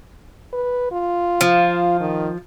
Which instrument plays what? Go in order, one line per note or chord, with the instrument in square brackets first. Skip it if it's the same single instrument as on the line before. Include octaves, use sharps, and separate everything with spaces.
[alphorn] B4
F4
[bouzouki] F3
[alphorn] D#3